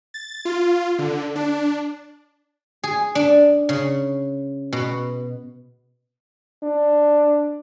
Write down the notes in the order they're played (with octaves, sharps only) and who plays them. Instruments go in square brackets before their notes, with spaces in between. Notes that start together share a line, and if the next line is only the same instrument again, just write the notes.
[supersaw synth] A6
F4
D3
D4
[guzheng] G#4
D4
C#3
B2
[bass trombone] D4